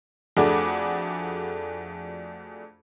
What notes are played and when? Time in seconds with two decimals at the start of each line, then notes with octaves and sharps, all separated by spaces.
0.37 F2 A3 D4 F#4 G#4 D6